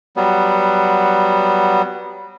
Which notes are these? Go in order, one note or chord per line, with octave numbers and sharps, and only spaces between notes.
F#3 G3 B3